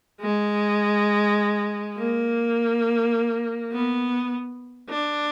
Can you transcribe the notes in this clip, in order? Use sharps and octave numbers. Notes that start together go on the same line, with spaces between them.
G#3
A#3
B3
D4